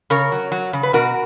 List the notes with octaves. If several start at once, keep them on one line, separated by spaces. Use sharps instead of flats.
C#3 A#4 C#5
F#3
F#3
C#3
B4
B2 F#4 A#4